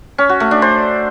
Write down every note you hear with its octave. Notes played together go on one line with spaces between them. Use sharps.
C#4
F#4
A3
D4
C5